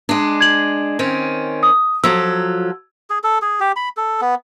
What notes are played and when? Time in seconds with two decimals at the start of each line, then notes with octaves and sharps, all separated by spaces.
0.09 G#3 D4
0.41 G#6 F#7
0.99 D#3 C4 C#4
1.63 D#6
2.04 F3 F#3 A4 E6
3.10 G#4
3.24 A4
3.42 G#4
3.60 G4
3.76 B5
3.97 A4
4.21 B3